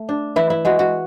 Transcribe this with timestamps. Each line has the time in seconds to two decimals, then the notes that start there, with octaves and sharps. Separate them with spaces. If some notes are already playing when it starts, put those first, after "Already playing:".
Already playing: A3
0.09 D4
0.36 E3 E4
0.50 E4
0.65 G#3 F#4
0.79 F#4